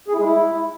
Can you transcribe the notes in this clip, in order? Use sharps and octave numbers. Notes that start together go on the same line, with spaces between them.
G#4
E4
G#3
E4